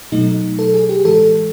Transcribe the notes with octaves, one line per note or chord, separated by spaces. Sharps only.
B2 F#3 A3 D#4
A4
G#4
G4
A2 E3 G#3 A4